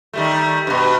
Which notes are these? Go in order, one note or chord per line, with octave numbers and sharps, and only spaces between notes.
D#3 G3 A3
G2 B2